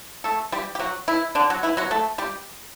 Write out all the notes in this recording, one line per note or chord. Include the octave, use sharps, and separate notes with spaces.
A3 A4
G3 G4
G4
F#3 F#4
E3 E4
D3 D4
F#3 F#4
E3 E4
F#3 F#4
A3 A4
G3 G4